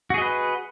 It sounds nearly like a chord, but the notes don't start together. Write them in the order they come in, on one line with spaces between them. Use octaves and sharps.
F#4 G#4 D#5 B4